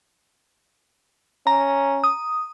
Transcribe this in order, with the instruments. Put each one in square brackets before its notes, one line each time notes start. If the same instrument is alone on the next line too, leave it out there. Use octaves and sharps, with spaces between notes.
[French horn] C#4 [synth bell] A#5
[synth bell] D#6